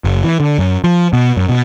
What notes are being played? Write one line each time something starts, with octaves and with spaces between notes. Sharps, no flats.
F#1
E3
D3
F#2
F3
B2
F#2
B2